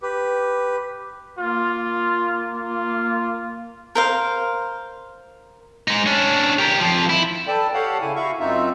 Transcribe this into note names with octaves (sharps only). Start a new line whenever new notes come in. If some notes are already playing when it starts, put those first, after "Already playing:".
G4 B4
A#3 F4
F4
A#4 C5 F5
G#3 D#4
C#4 D4
G4 A#4
F2 F3
E4
A4 B4 D5 G5 A5
G4 A4 C#5 F5 F#5 A5
C#3 E4 G#5
E4 F#4 E5 F5 C#6
F#2 C4 D#4 F4 E5